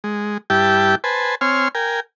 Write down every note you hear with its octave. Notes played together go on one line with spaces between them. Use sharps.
G#3
G2 E4 G4 G5 A5
B4 C5 G#5 A5
C4 C#5 G#5 C6 F6
A#4 G5 G#5